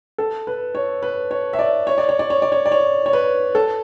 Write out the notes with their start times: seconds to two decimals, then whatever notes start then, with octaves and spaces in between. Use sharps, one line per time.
0.18 A4
0.47 B4
0.75 C#5
1.03 B4
1.31 C#5
1.53 E5
1.59 D5
1.87 C#5
1.98 D5
2.09 C#5
2.19 D5
2.30 C#5
2.42 D5
2.52 C#5
2.66 D5
2.72 C#5
3.06 C#5
3.13 B4
3.55 A4